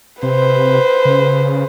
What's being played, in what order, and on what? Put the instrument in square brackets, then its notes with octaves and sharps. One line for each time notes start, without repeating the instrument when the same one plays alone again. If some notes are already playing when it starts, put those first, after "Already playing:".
[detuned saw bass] C3 [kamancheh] B4 C5
[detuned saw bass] C#3